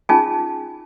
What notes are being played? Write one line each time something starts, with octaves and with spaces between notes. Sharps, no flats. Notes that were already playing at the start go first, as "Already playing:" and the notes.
C#4 D#4 F4 G#4 G#5 A5